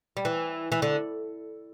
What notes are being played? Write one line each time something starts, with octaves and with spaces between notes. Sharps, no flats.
G3
E3
E3
D3